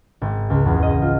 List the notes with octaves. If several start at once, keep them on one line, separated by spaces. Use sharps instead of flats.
G#1
C#2
E2
D#5
F4